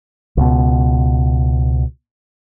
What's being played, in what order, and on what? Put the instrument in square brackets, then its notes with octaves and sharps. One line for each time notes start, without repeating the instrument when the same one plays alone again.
[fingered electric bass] C#2 B2